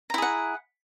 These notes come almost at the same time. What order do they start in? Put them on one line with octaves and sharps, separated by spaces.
A#5 E4 G#4 F#5